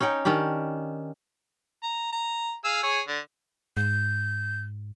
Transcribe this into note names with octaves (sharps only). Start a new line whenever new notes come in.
C#4 D#4 C#5 G5
D#3 C#4 D4 G4
A#5
A#5
G#4 F5 E6
G#4 C#5
D3
G#2 G6